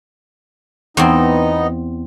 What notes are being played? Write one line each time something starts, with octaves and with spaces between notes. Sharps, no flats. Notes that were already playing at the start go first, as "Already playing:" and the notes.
E2 B3 C4 D#4 D#5